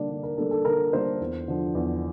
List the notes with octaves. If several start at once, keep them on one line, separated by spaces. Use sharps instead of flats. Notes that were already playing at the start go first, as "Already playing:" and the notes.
Already playing: D3 G3 A#3 D4
D3
A#4
G3 A#3 D4 A4
A4
D3 A#4
G3 A#3 D4 C5
E2
D3 F3
E2